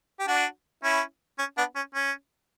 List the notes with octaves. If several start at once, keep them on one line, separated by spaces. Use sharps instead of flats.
G4
D4 F#4
C#4 E4
C#4
B3 D4
C#4
C#4